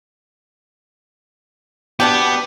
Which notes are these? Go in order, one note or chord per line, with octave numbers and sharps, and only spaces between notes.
B2 B3 D4 G4